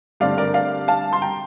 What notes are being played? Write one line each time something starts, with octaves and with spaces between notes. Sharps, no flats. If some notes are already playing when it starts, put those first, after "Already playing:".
G2 D3 A3 C4 D5 F5
A#4 D5
D5 F5
F5 A5
C6
G5 A#5